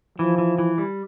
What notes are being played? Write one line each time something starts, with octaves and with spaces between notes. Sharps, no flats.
E3 F3
E3
E3
G3